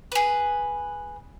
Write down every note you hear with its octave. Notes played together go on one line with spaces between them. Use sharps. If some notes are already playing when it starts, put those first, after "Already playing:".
G#4 B4